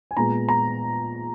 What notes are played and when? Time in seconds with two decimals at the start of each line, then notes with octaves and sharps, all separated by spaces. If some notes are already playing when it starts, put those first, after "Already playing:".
0.11 G#5
0.17 A#2 G#3 B3 A#5
0.49 A#5